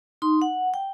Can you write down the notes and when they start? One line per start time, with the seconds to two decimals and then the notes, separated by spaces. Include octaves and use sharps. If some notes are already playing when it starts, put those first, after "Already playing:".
0.22 D#4 C6
0.42 F#5
0.74 G5